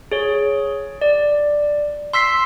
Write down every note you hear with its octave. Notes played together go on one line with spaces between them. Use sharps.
G#4 C#5
D5
C6 E6 B6 C7